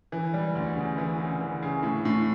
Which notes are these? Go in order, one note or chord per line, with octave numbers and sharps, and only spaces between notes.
E3
G3
D2
C#3
E3
C#3
E3
C#3
A2
A2